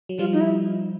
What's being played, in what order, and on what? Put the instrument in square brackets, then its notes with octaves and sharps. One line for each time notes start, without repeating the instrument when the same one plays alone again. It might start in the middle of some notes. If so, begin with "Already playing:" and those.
[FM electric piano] F#3
[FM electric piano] F3 G3 [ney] F4
[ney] D#4
E4